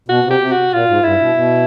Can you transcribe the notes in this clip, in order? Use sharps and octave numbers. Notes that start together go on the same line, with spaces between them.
B2 F#4
C3
G4
C3
F#4
A#2 F4
G#2
G2 E4
B2
B2